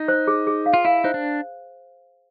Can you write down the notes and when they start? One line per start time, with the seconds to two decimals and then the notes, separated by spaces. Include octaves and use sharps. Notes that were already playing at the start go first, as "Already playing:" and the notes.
Already playing: D#4
0.08 C5
0.27 G#4
0.47 G#4
0.66 F5
0.74 F4
0.85 E4 F5
1.04 D#4 C5
1.14 D4